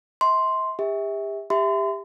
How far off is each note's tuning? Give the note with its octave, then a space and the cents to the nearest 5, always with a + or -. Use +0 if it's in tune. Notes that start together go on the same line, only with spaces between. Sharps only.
E5 -45 C6 +0
G4 +40 E5 -25
G4 +20 E5 +0 C6 -40